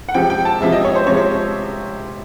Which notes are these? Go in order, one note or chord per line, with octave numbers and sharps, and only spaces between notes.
F#5
C3 F3 G#3 G5
G5
A5
C3 F3 G#3 E5
D#5
C#5
C5
C3 F3 G#3 C#5